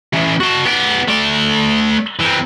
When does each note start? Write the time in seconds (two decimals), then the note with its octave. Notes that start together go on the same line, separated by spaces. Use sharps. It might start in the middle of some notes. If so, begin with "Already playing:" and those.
0.13 E3 C#4
0.40 F#4 A5
0.66 B3 D5
1.08 A3 D5
2.20 E3 C4